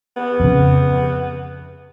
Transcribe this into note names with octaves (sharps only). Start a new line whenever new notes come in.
B3
F2 C#3